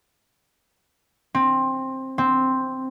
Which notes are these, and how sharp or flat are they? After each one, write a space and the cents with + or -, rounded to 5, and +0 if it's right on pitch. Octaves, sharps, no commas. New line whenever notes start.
C4 +15
C4 +0